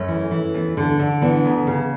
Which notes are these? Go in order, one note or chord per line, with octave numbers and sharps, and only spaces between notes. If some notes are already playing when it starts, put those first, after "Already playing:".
Already playing: F#2 A3 C#4
E3
E3
E2
D3
D3
E3 B3 D4
D2
C#3